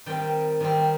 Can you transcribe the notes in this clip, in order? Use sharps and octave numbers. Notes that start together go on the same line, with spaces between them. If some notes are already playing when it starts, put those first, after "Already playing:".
D#3 G3 C4 G5
D#3 G3 C4